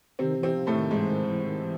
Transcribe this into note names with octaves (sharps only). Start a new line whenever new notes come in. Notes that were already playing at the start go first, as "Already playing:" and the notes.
C3 D#3 C4
E3
C3 C4
F3
A2 A3
D#3
G#2 E3 G#3
D#3
E3
D#3
E3